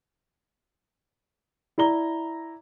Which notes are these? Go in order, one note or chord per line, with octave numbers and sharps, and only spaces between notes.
E4 D5 A#5 G7